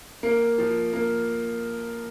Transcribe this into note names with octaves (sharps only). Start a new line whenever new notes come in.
A#3
F3
A#3